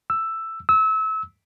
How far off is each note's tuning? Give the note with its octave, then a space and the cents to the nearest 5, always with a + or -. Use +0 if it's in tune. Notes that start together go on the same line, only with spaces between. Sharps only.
E6 +5
E6 -30